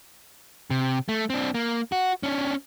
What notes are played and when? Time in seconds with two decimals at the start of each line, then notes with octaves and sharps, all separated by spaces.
0.70 C3
1.09 A3
1.30 C4 D4
1.54 A#3
1.92 F#4
2.23 C#4 D4